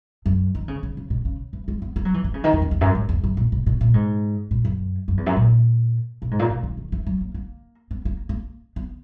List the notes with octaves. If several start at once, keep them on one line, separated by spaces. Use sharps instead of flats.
F#2
D#3
C#3
C#3
C#3
B2
C#3
E3
G#3
B3
A#3
F#3
E3
E3
C#3
D#3
E2
C#3
E2
F#2
G#2
E2
F#2
A#2
B2
B2
A#2
G#2
A#2
F#2
F#2
E2
F#2
A#2
B2
G#2
A#2
B2
D#3
D#3
E3
F#3
A#3
A#3
B3
A#3
A#3
B3